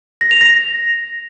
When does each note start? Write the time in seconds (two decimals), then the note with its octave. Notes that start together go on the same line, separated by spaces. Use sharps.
0.21 A#6
0.31 F7
0.41 A#6